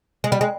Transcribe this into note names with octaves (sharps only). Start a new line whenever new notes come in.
G#3
G3
G#3